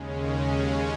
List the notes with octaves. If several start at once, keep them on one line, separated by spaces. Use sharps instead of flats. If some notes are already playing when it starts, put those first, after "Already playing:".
Already playing: D#2 C#3 G#3 C#4